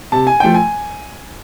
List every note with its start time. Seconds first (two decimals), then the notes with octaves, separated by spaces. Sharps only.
0.12 C3 A5
0.27 G#5
0.40 F3 A3 G5
0.54 G#5